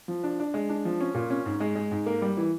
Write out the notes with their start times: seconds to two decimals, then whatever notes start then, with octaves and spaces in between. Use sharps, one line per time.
0.08 F3
0.23 D4
0.40 D4
0.54 G#3
0.69 D4
0.85 F3
1.00 C#4
1.14 A#2
1.30 C#4
1.46 G#2
1.60 G#3
1.75 G#3
1.91 G#2
2.06 A#3
2.22 G3
2.37 E3